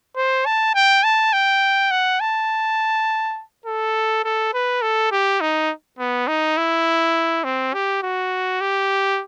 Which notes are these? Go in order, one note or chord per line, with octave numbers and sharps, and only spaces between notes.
C5
A5
G5
A5
G5
F#5
A5
A4
A4
B4
A4
G4
D#4
B3
D#4
E4
C4
G4
F#4
G4